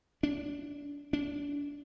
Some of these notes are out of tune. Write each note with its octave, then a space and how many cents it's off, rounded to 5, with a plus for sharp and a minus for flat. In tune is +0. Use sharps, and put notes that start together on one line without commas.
D4 -25
D4 -30